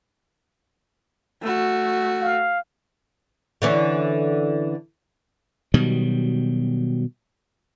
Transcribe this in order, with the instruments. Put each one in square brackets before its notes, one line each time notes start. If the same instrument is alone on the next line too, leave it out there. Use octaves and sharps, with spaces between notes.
[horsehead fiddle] A3 F#4
[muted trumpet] F5
[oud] D3 E3 C#4
[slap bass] B2 D#3 F#3 G3